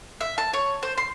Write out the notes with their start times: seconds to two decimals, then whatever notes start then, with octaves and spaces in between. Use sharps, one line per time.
0.21 E5
0.38 A5
0.53 C#5
0.83 C5
0.98 C6